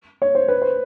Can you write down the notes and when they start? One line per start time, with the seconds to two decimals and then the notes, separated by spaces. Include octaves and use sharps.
0.22 C#5
0.35 C5
0.48 B4
0.62 C5